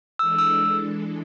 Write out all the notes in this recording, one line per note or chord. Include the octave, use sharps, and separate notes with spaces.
E3 G#3 D4 A4 E6
E6